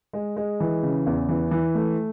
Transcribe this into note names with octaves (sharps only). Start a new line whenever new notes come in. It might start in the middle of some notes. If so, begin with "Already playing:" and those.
G#3
G#3
E3
C#3
E2
E3
E3
A3